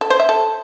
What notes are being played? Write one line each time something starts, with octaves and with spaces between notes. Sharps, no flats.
A4
C5
E5
A4